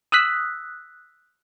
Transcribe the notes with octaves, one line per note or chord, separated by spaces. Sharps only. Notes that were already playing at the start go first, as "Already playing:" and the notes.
D#6 E6 F#6 B6